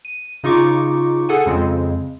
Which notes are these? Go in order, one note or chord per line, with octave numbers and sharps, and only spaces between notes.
D#7
C#3 D#4 F4 C#6 D6
G#4 A4 F#5 G#5
F2 C#3 G#3 C4